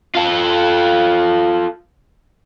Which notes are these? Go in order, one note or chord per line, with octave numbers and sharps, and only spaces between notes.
F4 A4